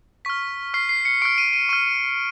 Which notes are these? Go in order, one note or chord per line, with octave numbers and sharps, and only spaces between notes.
C#6 F6 B6
C#6 F6 C7
C7
C#7
C#6 F6 D7
D#7
D#7
C#6 F6 D#7